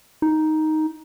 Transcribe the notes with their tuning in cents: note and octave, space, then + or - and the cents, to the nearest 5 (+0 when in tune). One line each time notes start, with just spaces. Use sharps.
D#4 +5